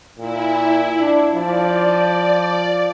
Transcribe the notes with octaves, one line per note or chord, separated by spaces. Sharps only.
A#2 E4
D4
F3 D5